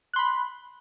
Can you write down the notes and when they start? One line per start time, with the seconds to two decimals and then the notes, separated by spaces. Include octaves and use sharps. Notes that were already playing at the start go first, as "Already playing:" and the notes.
0.13 F#6
0.16 C6
0.19 B5